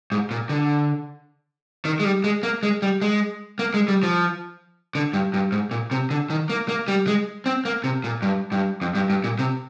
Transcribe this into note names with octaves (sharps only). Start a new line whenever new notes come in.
G#2
A#2
D3
D#3
G#3
G3
G#3
A#3
G#3
G3
G#3
A#3
G#3
G3
F3
D3
G2
G2
G#2
A#2
C3
D3
D#3
A#3
A#3
G3
G#3
C4
A#3
C3
A#2
G2
G2
F2
G2
G2
A#2
C3